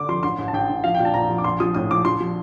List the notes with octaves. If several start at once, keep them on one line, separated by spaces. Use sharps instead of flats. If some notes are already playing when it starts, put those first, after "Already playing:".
Already playing: D3 D6
F3 C6
A1 C6
A1
A5
A1 G5
A1
F3 F5
G5
A#2 A5
A#1 A#5
F3
D6
A#1 C6
F3 D#6
A2 D#6
A#1 D6
F3 C6
F3